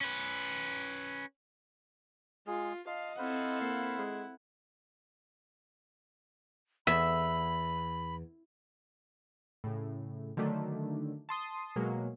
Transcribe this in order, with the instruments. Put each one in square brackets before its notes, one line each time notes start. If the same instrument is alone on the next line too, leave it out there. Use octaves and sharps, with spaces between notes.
[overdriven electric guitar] C#4 B4
[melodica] G#3 G#4 [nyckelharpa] F4
[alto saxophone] D#5 [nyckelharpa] F5 [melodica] A5 C6
[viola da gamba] C4 A4 [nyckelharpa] E4 F#5 [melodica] C5 F5 B5
[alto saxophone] A#3
G#3
[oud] E2 [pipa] E5 [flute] B5
[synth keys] A2 C#3
D3 D#3 F#3 A3 D4
A5 C6 D#6
B2 F#3 G#3 A#3